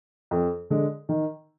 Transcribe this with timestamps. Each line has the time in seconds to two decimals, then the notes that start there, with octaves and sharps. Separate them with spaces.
0.31 F2
0.70 D3 G#3
1.09 D#3